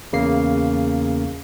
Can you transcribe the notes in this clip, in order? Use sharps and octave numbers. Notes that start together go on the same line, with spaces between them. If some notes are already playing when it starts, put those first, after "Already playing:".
E2 C#3 A#3 C7